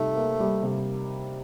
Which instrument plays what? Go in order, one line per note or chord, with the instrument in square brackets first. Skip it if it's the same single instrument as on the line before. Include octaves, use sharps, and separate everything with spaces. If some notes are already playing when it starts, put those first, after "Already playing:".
Already playing: [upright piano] C3 G3 D#4 [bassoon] A3
[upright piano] A#3
G3
C3